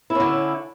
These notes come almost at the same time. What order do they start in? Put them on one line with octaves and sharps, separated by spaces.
E4 C#4 D3